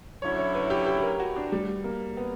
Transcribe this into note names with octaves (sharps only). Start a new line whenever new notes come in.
D3 F#3 C#4 E4 C#5
C#5
B4
G4
G4
G4
A#4
F#4
D4
G3
A#3
B3